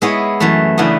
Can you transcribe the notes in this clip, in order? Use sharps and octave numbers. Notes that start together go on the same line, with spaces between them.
G#3 B3 E4 G#4 C#5
F#2 E3 A3
C#3 E3 B3 D4